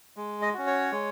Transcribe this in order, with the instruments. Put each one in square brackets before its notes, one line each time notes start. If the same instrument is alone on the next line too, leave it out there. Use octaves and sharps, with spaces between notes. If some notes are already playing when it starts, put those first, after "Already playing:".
[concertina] G#3
D#5
C#4 F#4
C#5
G#3